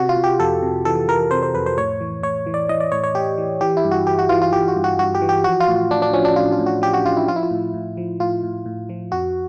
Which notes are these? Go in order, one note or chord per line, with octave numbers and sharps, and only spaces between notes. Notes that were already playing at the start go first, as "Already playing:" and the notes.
Already playing: C3 F#4
F4
C3
G4
F2 A4
C3
E3 A4
E3 A#4
C3 C5
C5
F2 B4
C5
A2 C#5
E3
A2 C#5
E3
D5
E3 D#5
D5
A2 C#5
C#5
A2 G4
E3
E3 G4
E4
G2
F#4
E3 G4
F#4
E3 F4
F4
E3 G4
F#4
G2
F#4
G2 F#4
G4
E3
G4
F3 F#4
F4
A2
A2 D4
D4
F3 C#4
D4
A2 F4
F4
A2
F#4
F3 G4
F#4
F3 F4
E4
F3 F4
E4
F4
A2
A2
F3
A2 F4
A2
A2
F3
F2 F#4